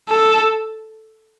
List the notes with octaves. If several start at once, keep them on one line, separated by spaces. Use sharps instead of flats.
A4